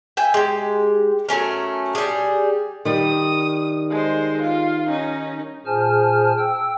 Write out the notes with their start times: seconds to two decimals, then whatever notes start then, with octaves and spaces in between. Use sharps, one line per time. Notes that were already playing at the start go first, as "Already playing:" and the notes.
0.17 E5 G5 G#5
0.34 G#3 G4
1.29 F#3 A3 C#4 A#4
1.95 G3 G#4
2.85 D#3 G3 D#6
3.91 G#3 C5
4.42 F4
4.88 C#4 D#4
5.66 A#2 G#4 C5 G#5 A5 F6
6.38 G5 E6